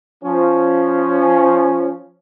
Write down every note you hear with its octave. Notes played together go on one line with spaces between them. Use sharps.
F3 C#4